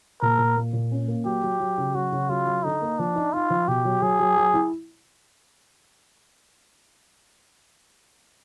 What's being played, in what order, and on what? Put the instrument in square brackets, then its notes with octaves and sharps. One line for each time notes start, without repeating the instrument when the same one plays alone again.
[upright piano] A#2 [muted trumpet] A#4
[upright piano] A#2
A#3
A#2
C#4
A#3
[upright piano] F#3 [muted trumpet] G4
[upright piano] F#3
F#3
C#3
[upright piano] F#3 [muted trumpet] F#4
[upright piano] C#3
[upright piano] F#3 [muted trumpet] F4
[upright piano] F#3
[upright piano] D3 [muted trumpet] D#4
[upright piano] A#3
[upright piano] F3 [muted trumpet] D4
[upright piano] D#4
[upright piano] D#4 [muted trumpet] F4
[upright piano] F3
[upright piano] B2 [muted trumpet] G4
[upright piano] F#3
[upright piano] F#3 [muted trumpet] G#4
[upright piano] F#3
F#3
E4